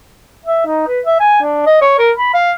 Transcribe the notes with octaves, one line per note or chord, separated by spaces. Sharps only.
E5
D#4
B4
E5
G#5
D4
D#5
C#5
A#4
B5
F5